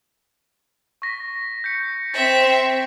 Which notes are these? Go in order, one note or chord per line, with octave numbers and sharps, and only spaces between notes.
C#6 A#6 B6
G6 B6 C#7
C4 E5 A6 C#7 F#7